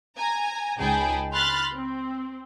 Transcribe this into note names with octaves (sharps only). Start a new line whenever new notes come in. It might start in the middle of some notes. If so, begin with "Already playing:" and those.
G#5 A#5
C#2 D#4 G#4 G5 A5 B5
B5 C6 F6 F#6 A6
C4